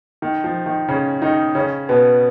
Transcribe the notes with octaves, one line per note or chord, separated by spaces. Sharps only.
D#3
F3
D#3
C#3 C#4
D#3 D#4
C#3 C#4
B2 B3